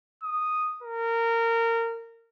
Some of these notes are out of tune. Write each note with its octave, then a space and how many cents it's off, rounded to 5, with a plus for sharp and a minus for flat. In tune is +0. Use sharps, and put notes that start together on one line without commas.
D#6 -5
A#4 -20